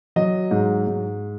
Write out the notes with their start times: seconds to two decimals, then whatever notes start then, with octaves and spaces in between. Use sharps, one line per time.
0.16 F#3 D#5
0.51 G#2
0.87 G#2